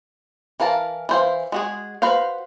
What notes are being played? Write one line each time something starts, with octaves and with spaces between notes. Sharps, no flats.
E3 A#4 F5 A5 A#5
E3 C5 F5
G#3 F#4 G#4
F#4 B4 C5 F5